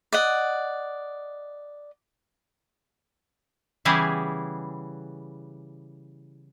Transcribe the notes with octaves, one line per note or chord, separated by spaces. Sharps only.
D5 D#5 F#5
C#3 E3 G3 B3 E4 G#4